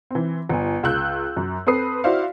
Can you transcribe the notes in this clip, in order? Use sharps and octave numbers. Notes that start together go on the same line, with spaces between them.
E3 C4
G1 G#5
C#2 E6 F#6 G6
F#2
C4 A4 B4 D#6 C7
E4 F#4 C5 D5 F5